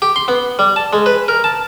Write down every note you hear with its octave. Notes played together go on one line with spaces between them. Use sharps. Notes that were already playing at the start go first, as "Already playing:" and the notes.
G4
C6
B3
G3
A5
G#3
B4
A#4
A5